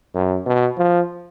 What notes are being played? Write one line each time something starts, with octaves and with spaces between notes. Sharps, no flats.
F#2
B2
F3